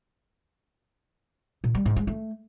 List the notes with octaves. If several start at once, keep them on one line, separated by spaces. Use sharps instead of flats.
A#2
G3
G#2
G#3
A3